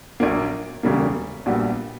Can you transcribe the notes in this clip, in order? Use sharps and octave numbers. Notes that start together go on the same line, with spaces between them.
A#1 A#2 F#3 A#3
E1 D2 C#3 G3 A#3
A#1 A#2 G3 B3 F#4